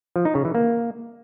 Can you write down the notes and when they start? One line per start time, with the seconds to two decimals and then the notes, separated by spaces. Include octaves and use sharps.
0.16 F3
0.25 D#4
0.35 C#3
0.45 E3
0.55 A#3